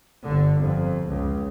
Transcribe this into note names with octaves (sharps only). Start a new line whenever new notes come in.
G1 D3
F2
C#2